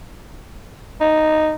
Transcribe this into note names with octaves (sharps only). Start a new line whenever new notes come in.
D#4